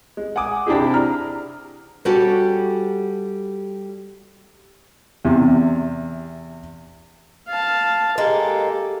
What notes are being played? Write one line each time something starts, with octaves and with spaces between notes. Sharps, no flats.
G#3
F#5 G#5 D6 D#6
C3 D4 E4 G4 G#4
A#5 F6
G3 C#4 F#4 G4 A4
E2 C3
F5 A5
G#3 A#3 G4 A4